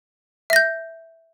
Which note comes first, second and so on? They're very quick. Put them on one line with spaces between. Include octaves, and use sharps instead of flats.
E5 A#6 G6